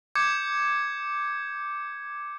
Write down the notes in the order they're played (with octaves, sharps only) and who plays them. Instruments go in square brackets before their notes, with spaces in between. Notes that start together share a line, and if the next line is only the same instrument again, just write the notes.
[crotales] D6 G6 G#6 C#7